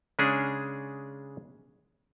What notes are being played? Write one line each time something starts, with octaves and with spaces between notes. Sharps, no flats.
C#3 G#3 C#4 D4 G#4